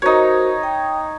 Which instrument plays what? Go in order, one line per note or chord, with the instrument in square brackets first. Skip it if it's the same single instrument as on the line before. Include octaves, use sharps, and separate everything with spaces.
[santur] D#4 C#5 [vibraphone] F#4 A#4 C5
[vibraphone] D#5 G5